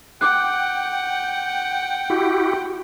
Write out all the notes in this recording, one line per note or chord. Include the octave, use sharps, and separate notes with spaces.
F#5 G5 D6 F#6
E4 F#4 G4